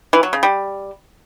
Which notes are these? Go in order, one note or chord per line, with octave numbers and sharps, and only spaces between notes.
E3
F#3
C#3
G3